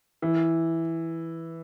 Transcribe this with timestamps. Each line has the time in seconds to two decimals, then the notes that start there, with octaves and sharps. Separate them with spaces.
0.22 E3